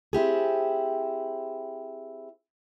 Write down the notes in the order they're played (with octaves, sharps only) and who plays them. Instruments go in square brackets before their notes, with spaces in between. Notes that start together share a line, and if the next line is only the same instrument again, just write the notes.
[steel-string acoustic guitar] C4 E4 G4 G#4